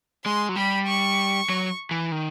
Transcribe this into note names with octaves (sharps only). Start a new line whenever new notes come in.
G#3 C6
F#3
G3 B5
C#6
F#3
E3
D#3